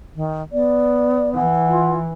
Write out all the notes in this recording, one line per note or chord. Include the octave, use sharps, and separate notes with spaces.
D#3
B3 D5
E3 F#5
F4